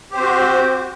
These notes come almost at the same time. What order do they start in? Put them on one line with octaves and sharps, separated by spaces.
G4 C5 C4 F#4